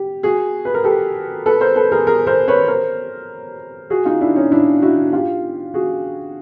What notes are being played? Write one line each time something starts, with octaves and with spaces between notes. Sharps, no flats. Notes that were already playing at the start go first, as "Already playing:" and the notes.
Already playing: G4
F#4 G#4
B4
A#4
G4 A4
A4 B4
A#4 C5
A4 B4
G#4 A#4
G#4 A#4
A#4 C5
B4 C#5
A#4 C5
F#4 G#4
D#4 F4
D4 E4
C#4 D#4
D4 E4
E4 F#4
F4 G4
F#4 G#4